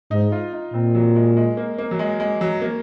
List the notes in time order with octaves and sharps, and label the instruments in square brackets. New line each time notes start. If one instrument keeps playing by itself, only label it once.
[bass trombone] G#2 [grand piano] D#4
[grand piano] F4
D#4
[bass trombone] A#2 [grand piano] C4
[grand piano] F#3
G#3
G#3
A#3
A#3
F#3
G#3
G#3
F#3
A#3